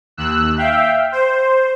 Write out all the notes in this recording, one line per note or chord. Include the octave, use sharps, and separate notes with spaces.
D#2 E6 F#6
E5 F5 G5
C5